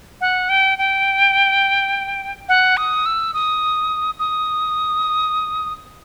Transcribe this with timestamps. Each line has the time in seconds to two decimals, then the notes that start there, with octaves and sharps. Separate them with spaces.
0.21 F#5
0.49 G5
0.78 G5
2.49 F#5
2.77 D#6
3.06 E6
3.34 D#6
4.19 D#6